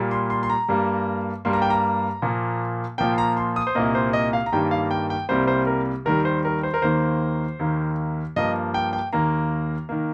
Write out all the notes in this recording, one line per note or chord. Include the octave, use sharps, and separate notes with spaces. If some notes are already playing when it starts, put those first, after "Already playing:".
Already playing: A#2 G3 A#3
C6
C6
C6
A#5
G2 G3 A#3
G2 G3 A#3 C6
A#5
G5
A#5
A#2 F3 A#3
A#2 F3 A#3 G5
C6
A#5
C6
D#6
C5
C2 A#2 A#3 D#5
C5
D#5
F5
A#5
G2 D#3 G3 A#3 G5
F5
G5
G5
C2 C3 G3 A#3 C5
C5
A#4
D#2 D#3 G3 A#4
C5
A#4
C5
A#4
D#2 D#3 A#3 C5
D#2 D#3 A#3
G2 F3 A#3 D#5
G5
G5
D#2 D#3 A#3 A#5
D#3 A#3